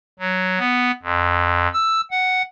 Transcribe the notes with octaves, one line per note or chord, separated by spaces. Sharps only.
F#3
B3
F2
E6
F#5